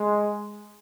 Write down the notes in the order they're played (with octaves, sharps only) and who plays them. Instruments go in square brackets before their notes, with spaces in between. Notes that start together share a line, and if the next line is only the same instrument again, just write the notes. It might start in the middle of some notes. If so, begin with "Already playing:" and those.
Already playing: [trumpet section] G#3